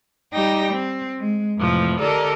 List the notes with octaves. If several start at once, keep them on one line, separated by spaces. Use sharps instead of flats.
G3 D#4 G4 G5 A#6
C4
G#3
F2 A2 C3 E3 F3
D3 G4 A4 A#4 D5 D#5